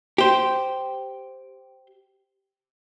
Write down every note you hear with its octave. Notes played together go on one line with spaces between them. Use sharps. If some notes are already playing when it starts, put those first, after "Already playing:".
G4 C5